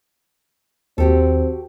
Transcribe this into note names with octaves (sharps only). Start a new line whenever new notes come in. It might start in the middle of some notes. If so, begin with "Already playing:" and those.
D#2 C4 F#4 G4 A4